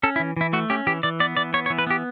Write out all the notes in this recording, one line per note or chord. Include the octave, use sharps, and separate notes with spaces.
C#4 A4
E4
E3
E3 E4
A3 F#4
C#4 G4
E3 G4
E3 D5
B3 D5
E3 D5
B3 C#5
C#5
E3
B4
B3 G4